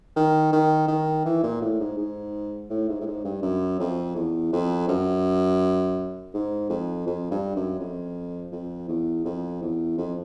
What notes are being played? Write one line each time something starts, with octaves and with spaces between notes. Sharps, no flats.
D#3
D#3
D#3
E3
A#2
A2
G#2
G#2
A2
G#2
A2
G#2
G2
F#2
F2
E2
F2
F#2
G#2
F2
F2
G2
F#2
F2
F2
E2
F2
E2
F2